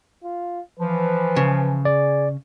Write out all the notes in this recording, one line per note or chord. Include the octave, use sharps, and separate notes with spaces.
F4
E3 F3 B4
C#3
G#4 D5